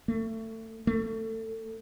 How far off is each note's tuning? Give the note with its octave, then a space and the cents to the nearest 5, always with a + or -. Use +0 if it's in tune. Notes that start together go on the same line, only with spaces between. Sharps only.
A3 +25
A3 +25